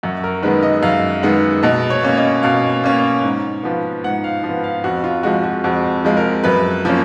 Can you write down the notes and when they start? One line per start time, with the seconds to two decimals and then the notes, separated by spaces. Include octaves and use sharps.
0.03 F#2 F#4
0.24 A#4
0.43 D#3 G#3 B3 B4
0.63 D#5
0.83 F#2 F5
1.23 D#3 G#3 B3 F#5
1.63 B2 D#5
1.90 C#5
2.03 A#3 C#4
2.17 D#5
2.43 B2 F5
2.84 A#3 C#4
3.24 G#2
3.63 F3 B3
4.04 G#2 F#5
4.24 F5
4.43 F3
4.49 B3
4.64 F5
4.84 F2 F#4
5.04 F4
5.23 F3 G#3 F#4
5.43 F#4
5.64 F2 F#4
6.04 F3 G#3
6.17 A#4
6.44 F#2 B4
6.85 F3 A#3 C#4